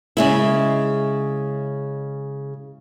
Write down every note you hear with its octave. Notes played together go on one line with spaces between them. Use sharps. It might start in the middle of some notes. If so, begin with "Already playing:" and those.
C#3 G#3 E4